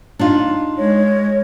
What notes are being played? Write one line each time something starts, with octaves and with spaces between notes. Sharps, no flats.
D4 D#4 F4
G#3 C#5